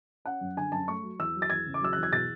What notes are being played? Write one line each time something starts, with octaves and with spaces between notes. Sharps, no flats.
C#4 F#5
F#2
D3 G#5
F#2 A5
A3 C#6
F#3
E2 E6
F#3
A6
E2 G#6
C#3
D6
F#3 E6
E2 F#6
G#6
B2 A6